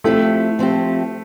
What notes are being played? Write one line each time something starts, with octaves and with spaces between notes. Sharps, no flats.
F3 A3 C4 E4 G4
F3 C4 E4 G4